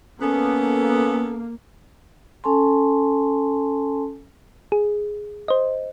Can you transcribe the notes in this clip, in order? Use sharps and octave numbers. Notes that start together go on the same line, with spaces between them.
A#3 B3 C#4 A4
C#4 A4 G#5 A5 C6
G#4
C5 D#5